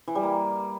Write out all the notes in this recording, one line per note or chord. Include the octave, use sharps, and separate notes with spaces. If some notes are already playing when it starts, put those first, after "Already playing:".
E3
G3
A#3